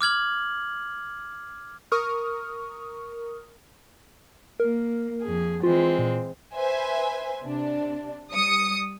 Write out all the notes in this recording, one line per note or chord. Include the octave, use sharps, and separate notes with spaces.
D6 F6 G#6 F#7
A#4 C#6 D#6 F6
A#3 A#4
F2 G#4
E3 G#3 C4 F4
A#2
B4 C5 E5 G#5
C3 D4
G3 D#6 C#7